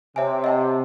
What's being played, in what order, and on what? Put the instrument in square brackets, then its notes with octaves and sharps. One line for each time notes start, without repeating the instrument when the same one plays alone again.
[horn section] C3 [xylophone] C#5 E5 G#5
[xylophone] D#5 F#5 A5